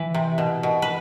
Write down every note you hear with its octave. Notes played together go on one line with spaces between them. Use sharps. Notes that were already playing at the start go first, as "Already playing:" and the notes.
Already playing: E3 B4
C3
B2
B2
B4